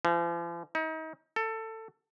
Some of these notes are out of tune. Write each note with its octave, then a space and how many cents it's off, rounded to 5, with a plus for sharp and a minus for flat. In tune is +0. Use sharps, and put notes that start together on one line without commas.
F3 -45
D#4 +35
A4 +20